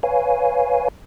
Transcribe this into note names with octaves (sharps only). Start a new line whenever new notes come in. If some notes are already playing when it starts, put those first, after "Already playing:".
B4 C#5 F5 G#5